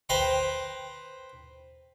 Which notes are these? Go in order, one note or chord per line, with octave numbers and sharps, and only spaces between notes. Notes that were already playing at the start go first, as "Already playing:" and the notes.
B4 C5 G5 A#5 C6